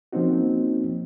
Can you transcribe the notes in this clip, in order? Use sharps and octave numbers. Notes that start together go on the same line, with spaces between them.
F3 A#3 C4 C#4 D#4 F#4